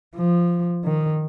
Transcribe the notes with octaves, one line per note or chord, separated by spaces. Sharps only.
F3
D#3